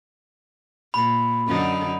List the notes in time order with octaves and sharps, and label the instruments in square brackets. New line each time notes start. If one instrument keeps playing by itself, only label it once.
[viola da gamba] A#2 [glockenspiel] B5
[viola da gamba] F#2 D3 D#4